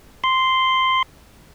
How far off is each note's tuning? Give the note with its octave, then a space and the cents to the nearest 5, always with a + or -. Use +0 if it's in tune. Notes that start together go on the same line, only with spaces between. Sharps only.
C6 -5